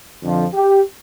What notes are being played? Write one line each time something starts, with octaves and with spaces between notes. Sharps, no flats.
F2 D3 F3
G4